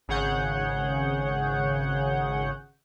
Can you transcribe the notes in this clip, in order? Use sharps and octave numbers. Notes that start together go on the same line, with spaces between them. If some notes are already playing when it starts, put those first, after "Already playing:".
G#1 C#3 G#4 C#5 F#5 G6